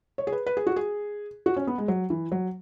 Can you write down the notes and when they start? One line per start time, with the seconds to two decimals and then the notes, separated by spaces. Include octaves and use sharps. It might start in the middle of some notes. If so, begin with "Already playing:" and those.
0.18 C#5
0.27 G#4
0.32 B4
0.46 B4
0.57 G#4
0.67 F#4
0.76 G#4
1.46 F#4
1.56 C#4
1.67 B3
1.78 G#3
1.88 F#3
2.10 E3
2.32 F#3